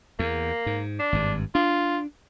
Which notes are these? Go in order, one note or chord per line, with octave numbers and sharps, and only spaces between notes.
E2 A#3
G#2
D4
G#1 G2
D4 F4